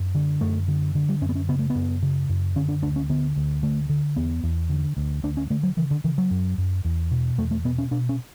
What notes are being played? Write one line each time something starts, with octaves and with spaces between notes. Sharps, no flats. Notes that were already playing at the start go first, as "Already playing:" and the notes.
Already playing: F#2
D3
F#2 A3
D3
D3
G3
F#2 C#4
B3
C#4
C#3 B3
A3
B3
F#2
C#3
F#2
D3 C#4
D4
D2 D4
C#4
D3 B3
D2
D3 A3
D3
E2 B3
E2
D3
D2
D2 D4
C#4
D3 A3
F#3
C#3 E3
D3
C#3 E3
F#3
F#2
F#2
E2
B2
E2 A3
A3
B2 B3
C#4
B2 D4
C#4